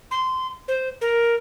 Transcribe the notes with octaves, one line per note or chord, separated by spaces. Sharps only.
C6
C5
A#4